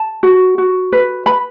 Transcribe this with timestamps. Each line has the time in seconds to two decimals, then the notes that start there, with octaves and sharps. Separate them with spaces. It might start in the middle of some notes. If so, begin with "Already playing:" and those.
Already playing: A5
0.23 F#4
0.58 F#4
0.92 B4
1.26 B4 B5